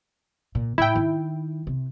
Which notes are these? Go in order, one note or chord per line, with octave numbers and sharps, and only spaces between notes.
A#2
A2 E4 G5
D#3
C3